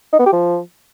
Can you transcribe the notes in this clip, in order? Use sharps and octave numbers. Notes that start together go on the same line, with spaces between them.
D#4
B3
G4
F3